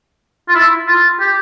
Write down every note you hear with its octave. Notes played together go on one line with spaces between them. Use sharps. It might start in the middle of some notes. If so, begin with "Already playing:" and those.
F4
E4
F4
G4